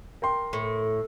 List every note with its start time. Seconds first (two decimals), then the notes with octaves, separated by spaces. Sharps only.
0.22 A#4 G5 C6
0.53 A2